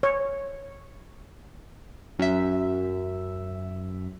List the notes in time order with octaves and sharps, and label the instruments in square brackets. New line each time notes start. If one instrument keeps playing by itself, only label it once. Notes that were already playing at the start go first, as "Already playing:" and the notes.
[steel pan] C#5
[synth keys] F#2 E5